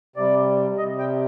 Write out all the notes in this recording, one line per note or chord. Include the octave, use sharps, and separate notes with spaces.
C3 G3 D5
C3 G3 D#5
G5